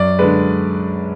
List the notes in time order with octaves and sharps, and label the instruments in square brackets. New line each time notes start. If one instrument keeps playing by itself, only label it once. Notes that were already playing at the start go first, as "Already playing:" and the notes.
Already playing: [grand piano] F#2 D5
D3 G#3 B4